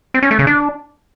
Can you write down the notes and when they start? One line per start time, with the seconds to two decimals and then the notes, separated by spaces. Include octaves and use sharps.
0.14 C4
0.23 C#4
0.31 A3
0.39 C#3
0.47 D4